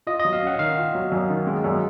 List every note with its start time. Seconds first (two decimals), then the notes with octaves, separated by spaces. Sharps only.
0.07 F4 D#5
0.20 D#5
0.25 F#3
0.33 F5
0.42 C#4 F#5
0.59 D#3 F5
0.77 F4
0.95 F#3
1.12 F#2
1.30 D#3
1.47 G#3
1.64 F#2